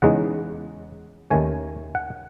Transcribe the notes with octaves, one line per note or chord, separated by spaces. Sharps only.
E2 C#3 G#3 D#4 F#5
D#2 D#3 A3 C#4 G#5
F#5